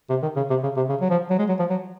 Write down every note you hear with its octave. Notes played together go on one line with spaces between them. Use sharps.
C3
D#3
C#3
C3
C#3
C3
C#3
F#3
F3
F#3
G#3
F#3
F3
F#3